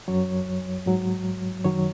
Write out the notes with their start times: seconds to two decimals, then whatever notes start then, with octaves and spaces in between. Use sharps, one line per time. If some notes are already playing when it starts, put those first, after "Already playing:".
0.08 F#2 F#3 C#5
0.86 G#2 F#3
1.65 F#2 D#3 F#3 C#5